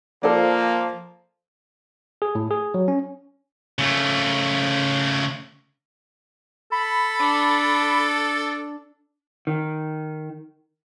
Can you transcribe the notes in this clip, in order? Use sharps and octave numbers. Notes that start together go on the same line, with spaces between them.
F3 A#3 A4 C5 D5
G#4
A2
G#4
F#3
C#4
C#3 A3
A4 B5
D4
D#3